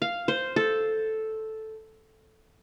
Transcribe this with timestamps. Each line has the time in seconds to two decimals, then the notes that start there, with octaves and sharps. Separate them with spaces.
0.02 F5
0.28 C5
0.56 A4